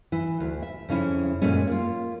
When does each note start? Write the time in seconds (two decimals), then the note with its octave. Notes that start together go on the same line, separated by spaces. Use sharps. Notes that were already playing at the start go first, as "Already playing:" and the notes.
0.12 E3 E4
0.40 D2
0.63 E5
0.89 F2 C#3 C#4 E4
1.42 F#2 A#2 F3 G#3 A3 C#4
1.67 A#3 F4